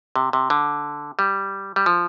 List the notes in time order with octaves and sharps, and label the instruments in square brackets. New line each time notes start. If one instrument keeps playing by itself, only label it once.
[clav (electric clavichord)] C3
C3
D3
G3
G3
F3